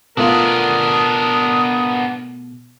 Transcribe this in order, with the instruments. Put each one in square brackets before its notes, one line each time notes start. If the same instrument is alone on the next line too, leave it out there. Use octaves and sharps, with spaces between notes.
[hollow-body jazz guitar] B2 A3 F4 [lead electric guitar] B3 D4 [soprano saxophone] A#4 [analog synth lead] D#6